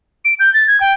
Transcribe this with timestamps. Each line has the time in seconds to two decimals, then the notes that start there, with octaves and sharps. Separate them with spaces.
0.25 D7
0.39 G6
0.54 A6
0.67 G#6
0.80 G5